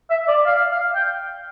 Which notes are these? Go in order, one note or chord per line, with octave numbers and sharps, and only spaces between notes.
E5
D5
F5
F5
G5